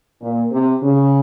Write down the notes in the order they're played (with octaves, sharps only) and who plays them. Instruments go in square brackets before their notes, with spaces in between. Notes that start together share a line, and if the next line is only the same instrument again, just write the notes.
[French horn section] A#2
C3
C#3